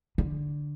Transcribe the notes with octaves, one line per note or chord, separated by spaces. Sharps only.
D3